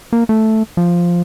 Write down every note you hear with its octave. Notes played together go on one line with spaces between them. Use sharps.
A#3
A3
F3